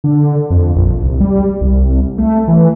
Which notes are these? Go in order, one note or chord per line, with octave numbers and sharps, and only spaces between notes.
D3
F2
A#1
C2
G3
C2
A3
E3